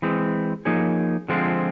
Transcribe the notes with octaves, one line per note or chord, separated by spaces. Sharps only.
E3 G#3 C4
F3 A#3 D#4 G#4 C#5
D3 F3 G#3 C4 F4